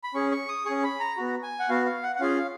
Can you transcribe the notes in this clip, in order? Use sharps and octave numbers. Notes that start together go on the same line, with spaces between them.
B5
C#4 G#4 C#6
C#6
D#6
C#4 G#4 C#6
B5
A#5
B3 F#4
G#5
F#5
B3 F#4 F5
F5
F#5
F#5
C#4 F4 G#4 F5